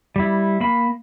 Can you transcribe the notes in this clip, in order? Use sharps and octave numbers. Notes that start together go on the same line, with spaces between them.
G3 E4
A#3 B5